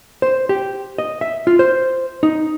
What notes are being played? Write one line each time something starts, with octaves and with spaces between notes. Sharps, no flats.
C5
G4
D#5
E5
F4
C5
D#4